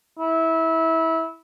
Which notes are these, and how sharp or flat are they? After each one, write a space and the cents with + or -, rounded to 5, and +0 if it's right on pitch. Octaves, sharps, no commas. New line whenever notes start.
E4 -20